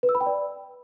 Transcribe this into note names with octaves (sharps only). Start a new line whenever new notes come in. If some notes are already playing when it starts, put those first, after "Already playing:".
B4
E6
B5
G5
D5